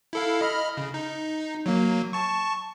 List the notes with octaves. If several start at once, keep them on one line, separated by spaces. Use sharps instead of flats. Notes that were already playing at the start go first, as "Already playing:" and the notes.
E4 A4 F5
D#5 B5 F6
C#3
D#4
F#3 A#3
A5 C#6